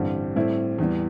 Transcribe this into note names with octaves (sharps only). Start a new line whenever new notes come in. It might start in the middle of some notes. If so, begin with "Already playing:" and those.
Already playing: A1 G2 D3 G3 C4
A2 G3 C4 E4
E2 E3 G3